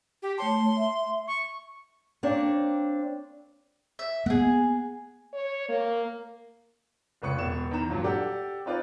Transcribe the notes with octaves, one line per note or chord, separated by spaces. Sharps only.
G4
A3 C#5 A5 C6
E5
C#6
A#3 C4 D4 C5 C#5
E5
A#3 B3 G#4 F#5
C#5
A#3
F1 C#2 B4 C#6 C#7
E1 B3 E7
E2 D#3 A#5 E7
G2 A#2 F#3
G4 A4 D5 F#5
C4 D#4 F4 B4 D5